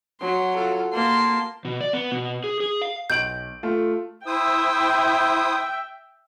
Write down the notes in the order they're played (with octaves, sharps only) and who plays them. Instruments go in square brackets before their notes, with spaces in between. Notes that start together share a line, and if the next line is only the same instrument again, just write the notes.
[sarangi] F#3 [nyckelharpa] C6
[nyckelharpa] F4 A4
[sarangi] A#3 [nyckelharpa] A5 C6
[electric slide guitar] B2
D5
B3
B2
G#4
G#4
F5
[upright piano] B1 D7 F#7 [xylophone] G6
[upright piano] A3 F4
[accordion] E4 C5 D#6 [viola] E5 G5